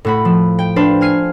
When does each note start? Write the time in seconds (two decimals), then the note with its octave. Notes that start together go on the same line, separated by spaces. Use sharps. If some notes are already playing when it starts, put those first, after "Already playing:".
0.05 A2 F#4 B5
0.25 F3
0.59 G5
0.76 D4 B4 C5 F5
1.01 G#5 F6 C7 D#7